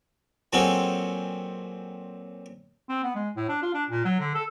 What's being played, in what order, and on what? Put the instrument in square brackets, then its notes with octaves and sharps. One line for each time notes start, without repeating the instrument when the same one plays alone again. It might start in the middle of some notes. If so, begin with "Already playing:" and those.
[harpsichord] A#2 F#3 C4 F#4 G#4 A4
[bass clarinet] C4
B3
G#3
A2
D4
F4
D4
A#2
F#3
D3
A4